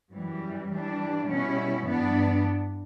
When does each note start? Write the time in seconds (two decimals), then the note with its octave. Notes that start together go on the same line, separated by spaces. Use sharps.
0.13 F#2 E3 G3
0.71 E3 G3 D4
1.27 B2 G3 C#4 E4
1.84 G2 E3 B3 D4